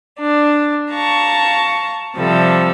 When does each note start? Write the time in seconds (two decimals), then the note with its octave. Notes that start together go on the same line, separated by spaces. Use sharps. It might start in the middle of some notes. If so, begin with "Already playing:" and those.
0.18 D4
0.92 F5 A5 A#5 C#6
2.15 C3 F3 G3 A4